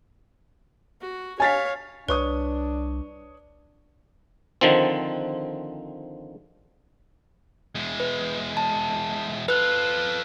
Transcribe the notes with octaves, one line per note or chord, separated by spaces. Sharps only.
F#4
C#5 F5 G#5 A6 B6
C2 D4 B4 C#5 C#6 D#6
D3 D#3 F3 C4
E2 G#3
B4
A5
F4 A4 B4 F#6